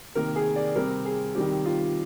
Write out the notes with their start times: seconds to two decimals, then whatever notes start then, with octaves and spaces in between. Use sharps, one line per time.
0.15 C3 D#3 A#3 A#4
0.36 G#4
0.56 D5
0.76 C3 G3 C4 A#4
1.05 G#4
1.35 D#3 G3 C4 G4
1.66 F4